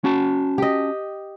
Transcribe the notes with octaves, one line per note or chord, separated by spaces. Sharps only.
C#4 F#4 A5
G4 D#5